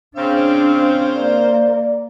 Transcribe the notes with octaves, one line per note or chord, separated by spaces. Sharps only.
C#3 C4 D4 C5 F5
A#3 D5